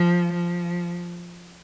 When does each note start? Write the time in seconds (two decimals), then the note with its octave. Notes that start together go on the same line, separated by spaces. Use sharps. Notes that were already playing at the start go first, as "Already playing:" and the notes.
Already playing: F3
0.33 F3